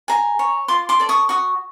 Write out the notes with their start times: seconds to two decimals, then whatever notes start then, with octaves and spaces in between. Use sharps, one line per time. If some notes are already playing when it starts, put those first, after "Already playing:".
0.08 G#4 G#5 A#5
0.39 C#5
0.68 F4 C6 D6
0.89 C6 D6
1.00 A4 D5
1.09 C#6 D#6
1.29 F#4 C#6 D#6